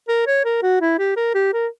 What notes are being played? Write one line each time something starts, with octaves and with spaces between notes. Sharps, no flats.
A#4
C#5
A#4
F#4
E4
G4
A#4
G4
A#4